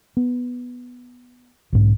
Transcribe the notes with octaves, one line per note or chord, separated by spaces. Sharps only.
B3
B1 G#2